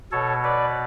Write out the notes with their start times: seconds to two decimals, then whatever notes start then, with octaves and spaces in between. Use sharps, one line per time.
0.12 B2 A4 C#5
0.44 B4 D5